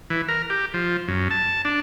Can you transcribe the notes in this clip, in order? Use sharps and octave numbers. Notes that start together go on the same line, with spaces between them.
E3
A#4
G4
F3
F#2
A5
D4